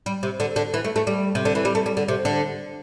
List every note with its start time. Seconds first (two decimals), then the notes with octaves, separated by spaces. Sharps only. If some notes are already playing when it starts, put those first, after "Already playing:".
0.06 G3
0.23 C3
0.40 D3
0.56 D3
0.74 E3
0.85 A3
0.96 A3
1.07 G3
1.35 C3
1.45 D3
1.55 E3
1.65 G3
1.75 A3
1.86 G3
1.97 D3
2.08 C3
2.25 D3